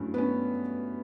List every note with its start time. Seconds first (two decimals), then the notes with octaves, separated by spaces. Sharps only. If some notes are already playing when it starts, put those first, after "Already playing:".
Already playing: G2 F#3 A3 C#4 E4
0.14 B3
0.18 C#4